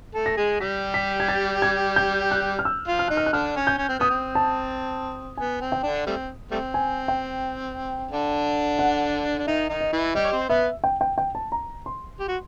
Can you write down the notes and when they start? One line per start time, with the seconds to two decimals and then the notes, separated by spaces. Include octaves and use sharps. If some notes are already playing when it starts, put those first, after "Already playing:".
0.15 A3 A4
0.26 A#6
0.37 G#3 G#4
0.60 G3 G4 B6
0.94 B6
1.20 G#6
1.29 A6
1.62 G#6
1.96 G6
2.31 F#6
2.59 F6
2.65 E6
2.88 F3 F4
2.99 F6
3.08 D#3 D#4 F#6
3.17 F6
3.26 F#6
3.33 D3 D4 F6
3.56 C#4
3.67 G6
3.78 C#4
3.89 C4
3.99 B3 D#6
4.10 C4
4.35 A5
5.37 B3 G#5
5.61 C4
5.72 G5
5.83 D3 D4
6.07 G3 A3 C4
6.51 G3 A3 C4
6.74 G#5
7.08 G5
8.11 D3 D4
8.79 F#5
9.39 D4
9.47 D#3 D#4 E5
9.69 D#3 D#4
9.81 D#5
9.93 E3 E4
10.15 G3 G4 D#5
10.24 C#5
10.32 C4 C5
10.49 B3 B4 E5
10.84 G5
11.01 G5
11.18 G5
11.35 A5
11.52 A#5
11.86 C6
12.20 G4
12.28 F#4